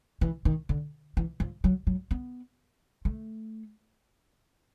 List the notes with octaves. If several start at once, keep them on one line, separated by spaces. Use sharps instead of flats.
E3
D#3
D3
E3
F3
F#3
F#3
B3
A3